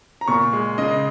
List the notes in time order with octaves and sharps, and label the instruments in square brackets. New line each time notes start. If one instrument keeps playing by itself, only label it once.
[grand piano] A#5
A#2 C#6
G#3
C#3 D#5